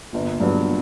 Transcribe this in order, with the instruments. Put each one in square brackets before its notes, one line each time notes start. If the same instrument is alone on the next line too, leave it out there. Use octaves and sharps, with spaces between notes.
[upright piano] G1 [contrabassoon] A#2
[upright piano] G2 F#3 B3